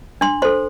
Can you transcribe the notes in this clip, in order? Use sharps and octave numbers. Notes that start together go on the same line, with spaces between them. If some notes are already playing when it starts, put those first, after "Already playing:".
D4 C6
A4 C5 C6